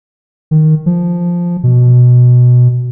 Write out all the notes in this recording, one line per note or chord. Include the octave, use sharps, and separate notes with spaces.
D#3
F3
B2